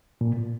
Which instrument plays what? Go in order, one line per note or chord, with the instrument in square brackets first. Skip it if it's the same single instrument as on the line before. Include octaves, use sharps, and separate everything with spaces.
[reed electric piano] A#2